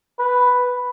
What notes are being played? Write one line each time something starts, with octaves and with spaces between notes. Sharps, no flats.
B4